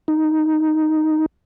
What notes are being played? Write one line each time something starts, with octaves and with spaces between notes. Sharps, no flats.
D#4